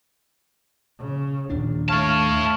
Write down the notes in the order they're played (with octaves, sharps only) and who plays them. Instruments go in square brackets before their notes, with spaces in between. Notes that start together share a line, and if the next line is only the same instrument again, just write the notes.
[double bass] C#3
[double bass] A#1 [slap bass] D#2 D#3 D4
[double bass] A3 [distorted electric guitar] E4 A5 [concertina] C#5 F5